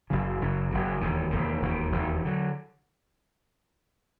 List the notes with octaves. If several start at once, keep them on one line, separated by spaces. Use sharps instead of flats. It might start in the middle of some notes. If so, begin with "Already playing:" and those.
F#1 F#2 C#3 F#3
F#1 F#2 C#3 F#3
F#1 F#2 C#3 F#3
E1 D#2 D#3
E1 D#2 D#3
E1 D#2 D#3
E1 D#2 D#3
D3 F#3